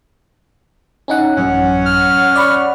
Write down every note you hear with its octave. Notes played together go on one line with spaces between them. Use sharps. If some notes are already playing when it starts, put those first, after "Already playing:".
C#4 D#4 F#5
A1 F#2 C#4 F#5
F6
D5 B5 C#6